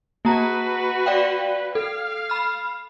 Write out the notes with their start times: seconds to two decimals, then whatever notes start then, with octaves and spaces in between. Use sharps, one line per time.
0.25 A#3 F#4 B4 A#5
1.06 D5 F5 G5
1.75 A4 F5
2.30 B5 F6